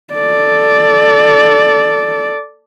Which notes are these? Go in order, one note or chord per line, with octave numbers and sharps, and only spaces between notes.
A4 D5